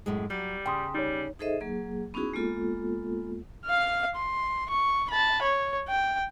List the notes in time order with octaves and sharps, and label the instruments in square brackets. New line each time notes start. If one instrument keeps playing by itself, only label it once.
[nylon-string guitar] F#2 A2 G#3
[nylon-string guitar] F#3 [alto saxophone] G3
[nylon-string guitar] C#3 [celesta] G5 C6 D#6
[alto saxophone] G3 [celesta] D#4 C#5
[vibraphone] D#4 G#4 A4 C5 D#5 E5
F#3 A#3 G#4
B3 C#4 D#4 E4 F#4 G#4
G#3 A#3 B3 F4 A4
[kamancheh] F5 F6
C6
C#6
A5 B5
C#5
G5